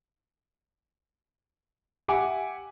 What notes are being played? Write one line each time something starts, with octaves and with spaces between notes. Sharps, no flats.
G4 E5 F#5 G#5 D6